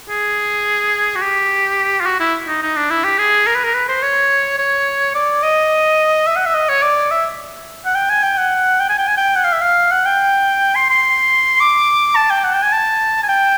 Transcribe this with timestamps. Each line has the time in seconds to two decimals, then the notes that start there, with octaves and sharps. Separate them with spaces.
0.09 G#4
1.16 F#4
1.22 G4
2.01 F4
2.06 F#4
2.20 E4
2.48 D#4
2.63 D#4
2.76 D4
2.91 E4
3.05 G4
3.19 G#4
3.47 A#4
3.55 B4
3.64 A#4
3.75 B4
3.89 C5
4.02 C#5
4.59 C#5
5.15 D5
5.43 D#5
6.27 E5
6.36 F#5
6.46 E5
6.55 D#5
6.69 C#5
6.83 D5
7.11 E5
7.85 F#5
7.95 G5
8.10 G#5
8.23 G5
8.38 F#5
8.80 G5
8.89 G#5
8.99 G5
9.08 G#5
9.17 G5
9.36 F#5
9.44 F5
9.53 E5
9.62 F5
9.92 F#5
10.06 G5
10.76 C6
10.90 C6
11.60 D6
12.16 A5
12.30 G5
12.44 F#5
12.54 G5
12.63 G#5
12.73 A5
13.23 G#5
13.29 G5